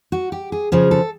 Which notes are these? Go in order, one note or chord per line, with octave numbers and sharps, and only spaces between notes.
F#4
G4
G#4
C#3 F3 G#4
A4